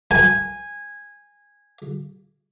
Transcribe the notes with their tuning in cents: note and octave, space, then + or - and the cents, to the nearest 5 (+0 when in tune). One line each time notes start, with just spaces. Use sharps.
G#5 -10